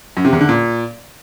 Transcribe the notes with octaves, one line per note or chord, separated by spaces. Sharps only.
F#2
C3
E2
D3
A#2